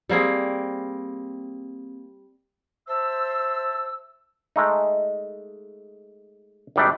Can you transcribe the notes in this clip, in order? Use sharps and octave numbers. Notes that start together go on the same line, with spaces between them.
G3 A#3 C4 G#4
C5 E5 A5 E6
G#3 A3 D#4
G#1 D#3 G3 A3 D4 G5